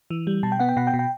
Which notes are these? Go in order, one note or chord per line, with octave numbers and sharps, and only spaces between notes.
E3
G3
B2 A5
G5
B3 F#5
G5
B2 F#5
G5
B2
G5